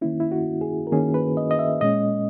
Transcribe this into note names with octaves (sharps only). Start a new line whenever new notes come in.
D#3 A#3 C#4 E4
E4
F#4
G#4
A#4
D#3 A#3 C#4 G#4
B4
D#5
D#5
E5
A#2 G#3 C#4 D#5